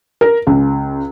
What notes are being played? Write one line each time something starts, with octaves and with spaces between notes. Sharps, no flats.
A#4
C#2